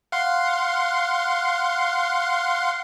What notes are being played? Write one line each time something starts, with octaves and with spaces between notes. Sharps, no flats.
F5 F#5 C6